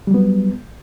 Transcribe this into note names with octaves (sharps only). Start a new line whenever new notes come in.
F#3 G3 B3